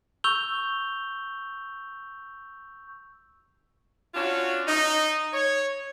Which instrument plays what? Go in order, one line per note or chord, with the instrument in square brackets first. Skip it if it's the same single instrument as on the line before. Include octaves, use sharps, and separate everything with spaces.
[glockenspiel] C#6 E6 G6 F7 G7
[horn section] C#4 D4 F4 F#4
D#4
C#5